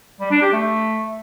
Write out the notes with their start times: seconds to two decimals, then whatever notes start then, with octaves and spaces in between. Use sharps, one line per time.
0.20 G3
0.31 D4
0.42 G4
0.53 A3